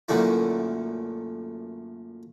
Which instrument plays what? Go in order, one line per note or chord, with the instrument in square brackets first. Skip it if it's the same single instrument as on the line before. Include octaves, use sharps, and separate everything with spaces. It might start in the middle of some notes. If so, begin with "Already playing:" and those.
[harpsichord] F#2 A#2 D3 A3 E4